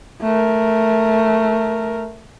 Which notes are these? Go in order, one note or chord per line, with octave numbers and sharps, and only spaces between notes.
A3 A#4